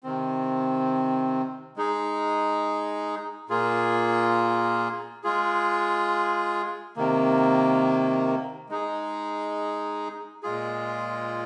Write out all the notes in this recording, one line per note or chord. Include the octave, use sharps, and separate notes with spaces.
C3 D#3 C4
G#3 D#4 G#4
A#2 A#3 F4 G#4
G#3 F4 G#4
C3 D#3 A#3
G#3 D#4 G#4
A#2 G#3 F4 G#4